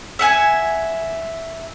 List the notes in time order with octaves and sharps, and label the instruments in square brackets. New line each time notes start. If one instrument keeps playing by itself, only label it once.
[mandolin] E5 F#5 G#5